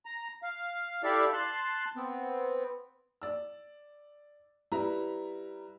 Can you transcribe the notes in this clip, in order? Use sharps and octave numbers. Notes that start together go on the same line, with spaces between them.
A#5
F5
E4 G4 A4 D5 E5 F5
A5 C6 F#6
B3 C4
D5 E6
G3 E4 B4 A#5